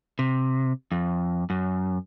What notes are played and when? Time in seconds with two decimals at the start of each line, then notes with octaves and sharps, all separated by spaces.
0.19 C3
0.92 F2
1.50 F#2